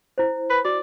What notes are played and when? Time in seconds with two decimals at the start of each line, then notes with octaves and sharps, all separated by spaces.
0.18 E4 C5
0.50 B4
0.65 F#4 D5